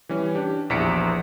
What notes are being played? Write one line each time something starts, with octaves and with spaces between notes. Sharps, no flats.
E3 G3 C#4
D4 G4
A#1 E2 B6 C#7 D7